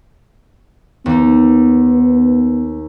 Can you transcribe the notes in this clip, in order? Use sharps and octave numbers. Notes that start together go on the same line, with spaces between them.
D#2 B3